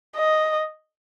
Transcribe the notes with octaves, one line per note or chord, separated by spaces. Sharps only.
D#5